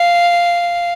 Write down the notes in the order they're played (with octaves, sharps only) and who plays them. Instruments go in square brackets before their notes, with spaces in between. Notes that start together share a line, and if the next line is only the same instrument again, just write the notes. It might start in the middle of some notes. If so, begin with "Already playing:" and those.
Already playing: [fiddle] F5